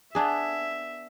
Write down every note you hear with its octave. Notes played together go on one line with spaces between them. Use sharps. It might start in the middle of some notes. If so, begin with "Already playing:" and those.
B3 D4 G#4 E5